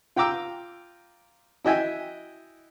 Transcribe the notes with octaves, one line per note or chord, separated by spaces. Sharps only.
F4 G5 A#5 D6 E6
E4 F#4 D#5 E5 G5 G#5